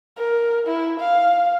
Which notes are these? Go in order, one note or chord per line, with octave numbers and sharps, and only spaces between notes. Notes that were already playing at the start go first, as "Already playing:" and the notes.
A#4
E4
F5